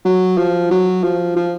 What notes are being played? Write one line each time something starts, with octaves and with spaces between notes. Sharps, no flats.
F#3
F3
F#3
F3
F3